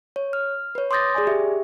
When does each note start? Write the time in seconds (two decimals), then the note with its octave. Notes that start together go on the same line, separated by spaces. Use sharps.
0.16 C#5
0.33 F6
0.75 B4 C#5
0.91 C6 D6 D#6 G6 A6 A#6
1.15 G#4 D5 G#5
1.27 G4 E5